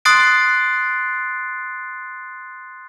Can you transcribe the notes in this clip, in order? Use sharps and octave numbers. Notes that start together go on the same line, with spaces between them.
C6 D#6 F#6 A6 C7 D7